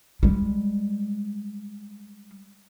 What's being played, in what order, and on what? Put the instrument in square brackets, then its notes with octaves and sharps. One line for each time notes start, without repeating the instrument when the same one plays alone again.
[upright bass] G3 G#3